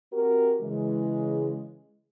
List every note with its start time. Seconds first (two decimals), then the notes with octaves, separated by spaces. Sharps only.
0.13 C4 F#4 G4 A#4
0.61 C#3 E3 G#3